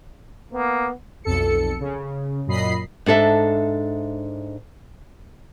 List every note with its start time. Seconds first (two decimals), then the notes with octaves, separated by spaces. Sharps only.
0.53 A#3 B3
1.24 B1 F2 A4 C#7
1.80 C#3
2.47 F#2 A#2 F#3 D#5 B5 C7
3.06 G#2 D4 A4 E5